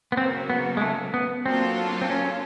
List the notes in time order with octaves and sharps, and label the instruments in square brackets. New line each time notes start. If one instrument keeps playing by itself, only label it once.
[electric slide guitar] B3
[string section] C#3 F#3 A#3 [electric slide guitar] C4
[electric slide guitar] B3
G#3
A3
B3
[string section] F#3 A#3 D4 F4 A4 [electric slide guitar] C4
[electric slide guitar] C4
C#4